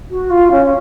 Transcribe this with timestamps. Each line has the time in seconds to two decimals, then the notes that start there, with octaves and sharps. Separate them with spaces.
0.10 F#4
0.30 F4
0.51 C#4